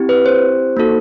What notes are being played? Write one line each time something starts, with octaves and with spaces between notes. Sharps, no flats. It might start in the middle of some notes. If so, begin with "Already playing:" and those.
Already playing: C4 E4 G4
B4
C5
A#3 D#4 F#4 A4